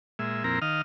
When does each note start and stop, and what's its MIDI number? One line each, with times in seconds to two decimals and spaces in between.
0.19 0.43 46
0.19 0.43 56
0.19 0.43 76
0.44 0.59 41
0.44 0.59 46
0.44 0.59 60
0.44 0.59 64
0.44 0.59 70
0.44 0.59 82
0.62 0.82 51
0.62 0.82 75
0.62 0.82 77
0.62 0.82 89